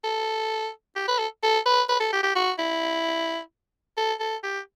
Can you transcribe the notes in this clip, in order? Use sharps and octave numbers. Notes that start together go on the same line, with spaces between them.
A4
G4
B4
A4
A4
B4
B4
A4
G4
G4
F#4
E4
A4
A4
G4